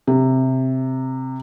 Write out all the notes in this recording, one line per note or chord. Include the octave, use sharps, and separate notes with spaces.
C3